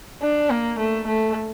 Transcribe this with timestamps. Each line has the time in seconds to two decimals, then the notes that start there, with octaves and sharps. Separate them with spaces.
0.22 D4
0.50 A#3
0.79 A3
1.07 A3